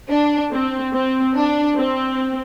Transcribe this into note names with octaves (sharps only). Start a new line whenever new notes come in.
D4
C4
C4
D4
C4